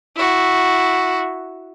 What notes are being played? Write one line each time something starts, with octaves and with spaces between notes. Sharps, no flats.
E4 F#4